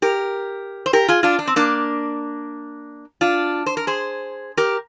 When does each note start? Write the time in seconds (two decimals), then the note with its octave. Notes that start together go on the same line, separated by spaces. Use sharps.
0.02 G4 A#4
0.86 C5
0.93 G4 A#4
1.08 F4 G#4
1.23 D4 F4
1.39 D4
1.47 C4
1.56 A#3 D4
3.21 D4 F4
3.66 C5
3.77 A#4
3.87 G#4 C5
4.57 G4 A#4